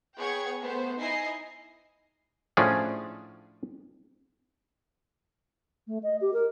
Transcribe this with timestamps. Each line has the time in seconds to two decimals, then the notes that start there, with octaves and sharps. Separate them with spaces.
0.18 B3 G#4 C#5 G5 C#6 G#6
0.61 A3 B3 C5
0.99 D#4 E4 D#5 G#5 C7
2.57 A2 F3 C#4 D4 G#4
5.87 A3
6.03 D#5
6.21 G4
6.33 A#4